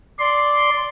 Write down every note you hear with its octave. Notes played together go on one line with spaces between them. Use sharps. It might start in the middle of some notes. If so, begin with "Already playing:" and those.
D5 C6